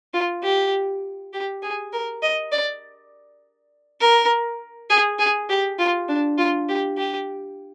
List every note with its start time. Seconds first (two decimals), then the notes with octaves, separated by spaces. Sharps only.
0.14 F4
0.43 G4
1.33 G4
1.63 G#4
1.93 A#4
2.22 D#5
2.52 D5
4.00 A#4
4.90 G#4
5.19 G#4
5.49 G4
5.78 F4
6.08 D4
6.38 F4
6.68 G4
6.98 G4